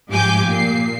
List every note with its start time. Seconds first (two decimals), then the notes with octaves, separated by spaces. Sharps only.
0.10 G#2 F3 G4 G#5 D6 G6
0.47 A#2 C7